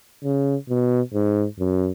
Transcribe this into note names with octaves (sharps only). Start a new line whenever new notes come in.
C#3
B2
G#2
F#2